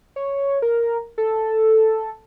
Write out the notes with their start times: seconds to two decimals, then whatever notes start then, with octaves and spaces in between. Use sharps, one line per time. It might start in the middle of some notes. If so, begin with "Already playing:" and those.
0.16 C#5
0.62 A#4
1.18 A4